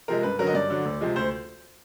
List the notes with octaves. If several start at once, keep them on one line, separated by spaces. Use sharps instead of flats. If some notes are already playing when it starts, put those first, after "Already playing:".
C3 F3 G#3 A#4
G2 B4
D3 F#3 A#4
D#5
G2 D5
D3 F#3
D2
C3 F3 G#3
D2 C5